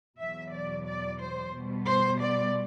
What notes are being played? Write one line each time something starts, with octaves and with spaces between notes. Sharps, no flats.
E2 B2 F#3 E5
D5
D5
C5
B2 G3 B3
C5
D5